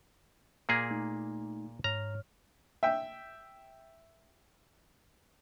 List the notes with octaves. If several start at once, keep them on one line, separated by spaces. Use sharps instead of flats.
A#2 A#3 G#4
A3 D#4
G#2 C#5 A#5 F6
E5 G5